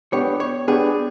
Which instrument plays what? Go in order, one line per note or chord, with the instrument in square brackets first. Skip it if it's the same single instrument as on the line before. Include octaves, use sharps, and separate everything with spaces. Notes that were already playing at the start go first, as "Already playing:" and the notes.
[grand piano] B3 D4 G4 [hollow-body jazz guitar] C#5
[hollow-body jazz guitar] C#5
[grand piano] B3 D4 G4 [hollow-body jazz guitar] G#4